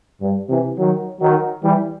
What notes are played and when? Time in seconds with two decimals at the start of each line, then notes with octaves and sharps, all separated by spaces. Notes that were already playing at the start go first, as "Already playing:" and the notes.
0.21 G2
0.49 C3 E3
0.77 D#3 F#3
1.20 D#3 F#3
1.64 E3 G3